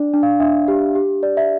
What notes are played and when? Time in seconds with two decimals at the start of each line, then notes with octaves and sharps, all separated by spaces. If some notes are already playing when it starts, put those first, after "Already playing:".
Already playing: D4 D5
0.14 D4
0.23 F5
0.40 D4 E5
0.68 G4
0.95 G4
1.23 D5
1.37 E5